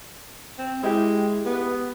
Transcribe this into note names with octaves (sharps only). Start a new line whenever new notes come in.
C4
G#3 E4 G4
B3